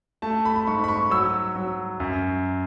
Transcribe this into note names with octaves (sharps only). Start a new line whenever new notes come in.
A3 A5
B5
B5
G#2 C#6
B5
C#6
F#3 E6
F#3
F#2